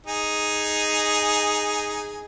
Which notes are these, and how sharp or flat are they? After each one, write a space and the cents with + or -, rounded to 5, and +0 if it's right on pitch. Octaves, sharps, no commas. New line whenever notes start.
D#4 +0 G#4 +0